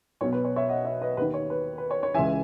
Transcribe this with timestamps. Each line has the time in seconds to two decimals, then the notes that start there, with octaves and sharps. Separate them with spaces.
0.21 B1 B2 C#5
0.33 B4
0.45 C#5
0.56 C#5 E5
0.69 D#5 F#5
0.85 C#5 E5
1.02 B4 D#5
1.17 D#2 D#3 B4
1.34 C#5
1.50 B4
1.78 B4
1.91 C#5
2.03 C#5
2.14 C#2 C#3 E3 E5 G#5